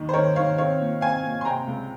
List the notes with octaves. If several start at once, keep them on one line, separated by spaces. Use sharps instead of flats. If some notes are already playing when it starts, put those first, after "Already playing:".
Already playing: D#2 D#3
C5
D#3 A#4 C#5
D#3 C#5 F5
C4 C#5 F5
A#2
C4 F5 G#5
A#2
C6
C3 G5 A#5
C#2